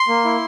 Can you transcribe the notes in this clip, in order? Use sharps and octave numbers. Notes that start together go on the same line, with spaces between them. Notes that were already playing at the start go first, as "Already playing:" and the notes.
Already playing: C6
A#3
E4